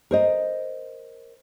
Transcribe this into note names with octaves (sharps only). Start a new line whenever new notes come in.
A#4 C5 D#5